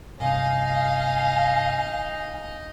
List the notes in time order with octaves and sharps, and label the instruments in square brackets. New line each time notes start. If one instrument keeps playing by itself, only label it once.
[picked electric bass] G1 C3 [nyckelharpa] D#4 D#5 [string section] F5 [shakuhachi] G#5